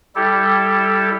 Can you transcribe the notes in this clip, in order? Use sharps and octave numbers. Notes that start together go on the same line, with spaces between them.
G3 E4 G4 A4